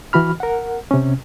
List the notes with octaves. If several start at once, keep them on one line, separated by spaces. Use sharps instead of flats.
E3 F#4 B5 F6
A#4 F#5
C3 C#4